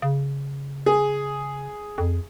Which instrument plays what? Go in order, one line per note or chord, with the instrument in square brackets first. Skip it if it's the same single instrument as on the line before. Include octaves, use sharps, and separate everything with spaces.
[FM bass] C#3
[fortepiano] G#4
[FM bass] F2